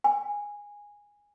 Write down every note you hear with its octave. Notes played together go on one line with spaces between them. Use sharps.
G#5